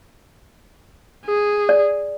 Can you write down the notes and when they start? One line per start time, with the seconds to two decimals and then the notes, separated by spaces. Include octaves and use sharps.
1.25 G#4
1.69 D5